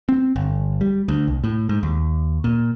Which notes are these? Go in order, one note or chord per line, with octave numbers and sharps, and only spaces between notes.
C4
G1
G3
D2
C2
A2
G#2
D#2
A#2